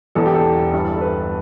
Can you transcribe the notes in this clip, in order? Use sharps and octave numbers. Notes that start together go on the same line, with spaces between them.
E1 E2 E3 A4
G4
A4
G1 G2 E3 G3
A4
B4